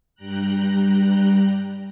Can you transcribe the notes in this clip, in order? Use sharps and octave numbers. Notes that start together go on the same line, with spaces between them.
G2 G3 G5 A#5 F#6